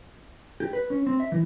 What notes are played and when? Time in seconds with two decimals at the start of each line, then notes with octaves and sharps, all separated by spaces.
0.60 G4
0.73 B4
0.90 C#4
1.06 C4
1.20 E5
1.32 E3